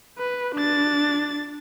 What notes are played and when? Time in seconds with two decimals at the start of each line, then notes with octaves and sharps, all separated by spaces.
0.18 B4
0.56 D4 A6